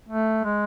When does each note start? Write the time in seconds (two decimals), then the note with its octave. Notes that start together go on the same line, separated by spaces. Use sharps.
0.09 A3
0.44 G#3